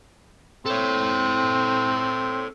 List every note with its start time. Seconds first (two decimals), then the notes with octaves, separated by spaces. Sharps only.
0.66 C4 A4 C#5